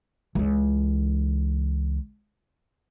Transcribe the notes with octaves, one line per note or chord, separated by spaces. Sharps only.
C#2 E3